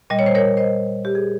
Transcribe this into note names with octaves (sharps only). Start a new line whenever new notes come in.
A#2 G3 D#5
C#5
C5
A#4 C#5
C5 D#5
G4
G#4